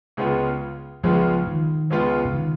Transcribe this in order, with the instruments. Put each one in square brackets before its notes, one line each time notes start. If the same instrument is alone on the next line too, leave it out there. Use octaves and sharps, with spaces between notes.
[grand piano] C#2 C#3 G#3 B3 F4
[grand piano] C#2 C#3 G#3 B3 F4 [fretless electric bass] F3
[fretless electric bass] D#3
[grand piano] C#2 C#3 G#3 B3 F4
[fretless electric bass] C#3
D#3